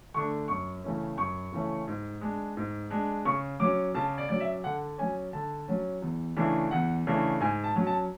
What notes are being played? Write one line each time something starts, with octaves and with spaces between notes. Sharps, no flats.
D3 A3 D4 C#6
F#2 C#6
C#3 E3 A3 C#4
F#2 C#6
C#3 E3 A3 C#4
G#2
G#3 D4
G#2
G#3 D4
C#3 C#6
F#3 C#4 D6
C#3 A5
D5
F#3 C#4 D5
E5
D3 F#5
F#3 C#4 G#5
D3 A5
F#3 C#4
E2
C#3 E3 A3 D4
E2 F#5
C#3 E3 A3 D4
G#2 G#5
A5
F#3 C#4
A5